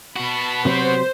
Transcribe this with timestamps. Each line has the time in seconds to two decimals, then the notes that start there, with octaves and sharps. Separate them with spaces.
0.16 B3 F#4 A5 B5
0.65 C3 F#3 C4 C5